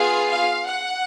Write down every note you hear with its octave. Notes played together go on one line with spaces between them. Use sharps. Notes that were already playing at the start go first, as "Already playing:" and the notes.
Already playing: B3 F4 G#4 F5
F5
F#5